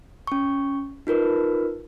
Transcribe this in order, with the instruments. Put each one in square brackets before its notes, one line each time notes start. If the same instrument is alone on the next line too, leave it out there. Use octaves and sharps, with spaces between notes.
[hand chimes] C#4 C#6
D#4 F4 A#4 B4